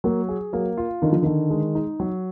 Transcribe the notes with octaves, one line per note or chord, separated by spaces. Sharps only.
F#3 A#3
G#4
F#3 A#3
F4
D3 D#3
F3
D3 D#3
G#3
D#4
F#3